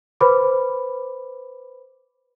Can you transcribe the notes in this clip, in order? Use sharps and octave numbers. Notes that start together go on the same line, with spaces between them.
B4 C5 B5 D6